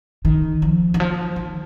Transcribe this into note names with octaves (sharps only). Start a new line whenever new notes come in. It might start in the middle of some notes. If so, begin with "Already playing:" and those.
D#3
F3
D#3
F3
D#3